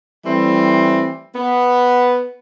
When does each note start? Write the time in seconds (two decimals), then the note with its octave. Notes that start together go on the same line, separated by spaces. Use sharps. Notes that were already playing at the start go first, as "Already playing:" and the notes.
0.25 E3 G3 A3 C4
1.35 B3